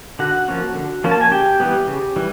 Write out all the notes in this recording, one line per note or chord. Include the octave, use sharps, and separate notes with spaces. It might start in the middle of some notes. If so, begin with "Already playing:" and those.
D3 F#4 F#5
F3 A#3 C#4
D3
F3 A#3 C#4
A5
G#5
C#3 G4 G5
E3 G3 B3
C#3
E3 G3